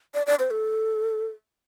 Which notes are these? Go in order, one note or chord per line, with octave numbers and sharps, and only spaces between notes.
D5
D5
C5
A4